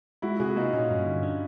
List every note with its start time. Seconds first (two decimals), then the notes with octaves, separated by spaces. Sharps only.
0.22 G#3 E4 F#4
0.40 C3 F#4 G#4
0.56 A#3 D#4 F4
0.73 A#2 C#4 D#4
0.90 G2
1.06 D3
1.23 D4